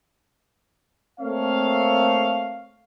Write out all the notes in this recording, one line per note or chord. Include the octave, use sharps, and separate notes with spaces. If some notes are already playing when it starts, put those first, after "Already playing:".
A3 A#3 C4 C#5 F5